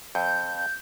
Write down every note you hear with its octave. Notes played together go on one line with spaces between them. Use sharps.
F2 G6